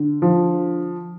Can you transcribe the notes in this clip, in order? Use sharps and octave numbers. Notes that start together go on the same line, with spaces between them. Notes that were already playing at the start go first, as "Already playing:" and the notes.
Already playing: D3
F3